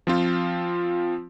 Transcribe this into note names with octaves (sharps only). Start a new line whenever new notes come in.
F3 C4 F4